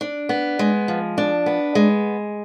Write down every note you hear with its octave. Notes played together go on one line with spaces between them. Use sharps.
D4
B3
G#3
F3
D4
B3
G#3